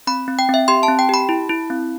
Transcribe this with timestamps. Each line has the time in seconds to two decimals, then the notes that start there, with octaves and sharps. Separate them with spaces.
0.07 C4 B5
0.28 C4
0.39 G5
0.49 C4
0.54 E5
0.68 G4 C6
0.83 A5
0.88 C4
0.99 G5
1.09 G4 B5
1.29 E4
1.49 E4
1.70 C4